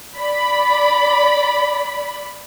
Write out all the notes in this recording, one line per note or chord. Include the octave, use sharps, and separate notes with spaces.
D5 B5